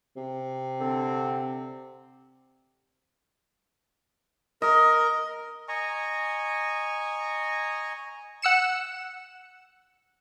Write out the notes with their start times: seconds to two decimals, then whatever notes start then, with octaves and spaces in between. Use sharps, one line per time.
0.16 C3
0.80 D3 C4
4.62 A#4 D#5
5.68 D#5 G#5 A#5 C#6
8.42 F#5 E6 C#7 E7